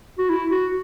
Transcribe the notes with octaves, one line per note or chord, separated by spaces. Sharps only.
F#4
E4
F#4